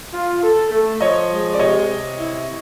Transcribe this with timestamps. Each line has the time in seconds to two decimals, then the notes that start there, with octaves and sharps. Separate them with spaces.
0.13 F4
0.42 A4
0.71 A3
1.00 F3 C#5 D#5
1.30 G#3
1.54 D5
1.59 C3 C#5 D#5
1.89 C3
2.19 E4